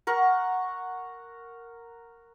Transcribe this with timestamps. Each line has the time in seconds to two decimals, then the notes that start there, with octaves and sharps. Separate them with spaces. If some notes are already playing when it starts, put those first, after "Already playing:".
0.07 A#4 F#5 C#6